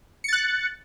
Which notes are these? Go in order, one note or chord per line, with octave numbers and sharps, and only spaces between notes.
F#6 A6 C#7